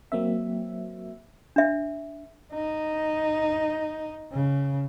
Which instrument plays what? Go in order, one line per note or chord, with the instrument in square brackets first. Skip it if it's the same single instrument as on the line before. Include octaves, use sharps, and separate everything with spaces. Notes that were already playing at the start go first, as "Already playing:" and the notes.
[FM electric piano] F#3 A#3 C4 E5
[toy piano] D4 E5
[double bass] D#4
C#3